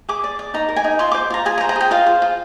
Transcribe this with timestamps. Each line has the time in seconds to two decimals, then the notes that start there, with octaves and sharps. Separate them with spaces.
0.09 G#4 D6
0.24 D5
0.39 D5
0.54 D#4 A#5
0.69 A#4
0.76 G#5
0.84 D#4
0.99 F4 C6
1.12 C5 D6
1.30 F4 A#5
1.45 G#4 G#5
1.58 A#5
1.61 C5
1.69 A#5
1.76 G#4 G5
1.91 F4 F5
2.06 C5
2.22 F4